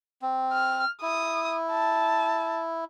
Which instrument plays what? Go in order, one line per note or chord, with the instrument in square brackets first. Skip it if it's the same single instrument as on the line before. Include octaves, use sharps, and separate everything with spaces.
[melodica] C4
[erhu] F6
[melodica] E4 [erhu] D#6
[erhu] A5